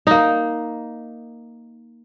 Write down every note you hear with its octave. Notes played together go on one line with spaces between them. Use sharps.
A#3 D#4